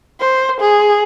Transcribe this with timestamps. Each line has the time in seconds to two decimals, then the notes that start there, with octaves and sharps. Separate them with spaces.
0.20 C5
0.61 G#4